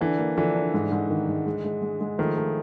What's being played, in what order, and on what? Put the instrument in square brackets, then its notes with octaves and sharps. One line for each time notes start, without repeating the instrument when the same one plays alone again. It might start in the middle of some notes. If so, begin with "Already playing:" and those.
[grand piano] D3 E3 [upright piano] D4
[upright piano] A#3
[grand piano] D3 E3 [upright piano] F3
[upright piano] D4
G#2
G#2
D#3
G#2
G#3
G#3
G#3
G#3
[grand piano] D#3 F3 [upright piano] A3
[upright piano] A3